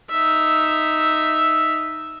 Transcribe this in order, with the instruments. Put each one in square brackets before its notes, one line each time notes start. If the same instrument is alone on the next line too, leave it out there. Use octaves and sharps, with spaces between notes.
[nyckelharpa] D#4 E5